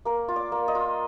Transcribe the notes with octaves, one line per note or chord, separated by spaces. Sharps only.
A#3 A#4
F4
D5
A#3
D#5
F4